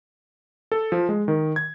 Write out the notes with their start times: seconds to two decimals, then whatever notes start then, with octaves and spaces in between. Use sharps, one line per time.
0.72 A4
0.92 F3
1.09 G#3
1.28 D#3
1.56 G#6